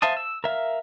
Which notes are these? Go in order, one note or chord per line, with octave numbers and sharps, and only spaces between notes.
C5 E5 F5 A5 D#6
E6
A#4 E5 F5